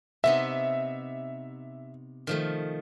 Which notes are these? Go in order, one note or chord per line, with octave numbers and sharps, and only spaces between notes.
C3 B3 D#4 E5
D#3 F3 A3